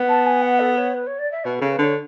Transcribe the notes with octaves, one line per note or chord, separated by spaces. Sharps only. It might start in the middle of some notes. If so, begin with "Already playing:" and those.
Already playing: B3
A5
G#5
F#5
A4
C#5
B4
C#5
D5
E5
B2 B4
C#3 A4
B4
D3 C#5